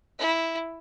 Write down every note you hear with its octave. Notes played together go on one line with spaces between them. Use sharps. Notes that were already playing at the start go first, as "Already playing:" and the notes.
E4